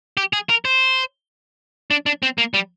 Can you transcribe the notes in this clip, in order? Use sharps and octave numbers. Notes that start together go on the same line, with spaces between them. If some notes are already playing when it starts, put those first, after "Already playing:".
G4
G#4
A#4
C5
D4
D4
C4
A#3
G3